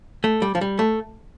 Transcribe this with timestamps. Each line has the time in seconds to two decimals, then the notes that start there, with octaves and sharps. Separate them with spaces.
0.24 A3
0.42 G3
0.55 F3
0.61 G3
0.79 A3